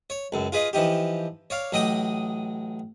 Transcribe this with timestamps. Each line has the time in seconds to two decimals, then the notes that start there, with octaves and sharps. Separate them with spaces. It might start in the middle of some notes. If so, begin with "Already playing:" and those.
0.10 C#5
0.32 C#2 F#2
0.52 F4 G#4 B4 D#5
0.73 E3 F3 D#4 G4
1.50 C#5 D5 F5
1.72 A1 F#3 D#5 G5 D6 D#6